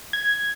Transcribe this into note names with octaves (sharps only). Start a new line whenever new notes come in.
G#6